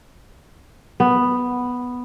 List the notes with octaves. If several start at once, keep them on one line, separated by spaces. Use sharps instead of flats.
B3